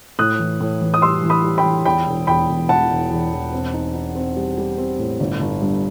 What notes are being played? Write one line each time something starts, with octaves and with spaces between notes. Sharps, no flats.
A2 D#6 F#6
E3
A2
E3
D#6
G3 C6 E6
E3
B5 D#6
G3
G5 B5
E3
E2 G5 B5
E1
E2 G5 B5
E1
E1 F#5 A5
E1
E2
E1
C4
D#4
D#4
C4
G3
G3
C4
A2
G1
G1
G2